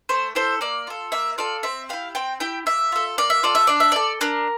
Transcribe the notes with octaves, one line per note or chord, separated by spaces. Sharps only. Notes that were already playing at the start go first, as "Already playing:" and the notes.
A3 C5
E4 A4 C5
A#3 D5
F4 A4
A#3 E5
F4 A4 D5
C4 E5
E4 G4 F5
C4 G5
E4 G4 G5
A#3 E5
F4 A4
A#3 D5
E5
F4 A4 D5
E5
D4 D5
E5
A4 D5
D4 A#4